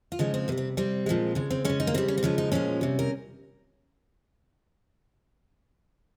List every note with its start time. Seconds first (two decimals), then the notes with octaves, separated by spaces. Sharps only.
0.12 F4
0.19 C#3 F3 G#3 D#4
0.34 C4
0.48 C3 A#3
0.52 G3
0.58 C4
0.77 C3 G3 C4
1.06 A#2 F3 G#3
1.35 C#3 G#3
1.51 C4
1.65 C#3 G#3 C#4
1.80 D#4
1.87 A#3
1.94 C#3 G3 C4
2.08 C#4
2.18 C4
2.23 C#3 F3 G#3 C#4
2.38 D#4
2.52 A#2 F3 G#3 C#4
2.81 C3 G3
2.99 A#4